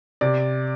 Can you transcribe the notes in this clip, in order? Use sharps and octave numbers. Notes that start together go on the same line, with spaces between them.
C3 D5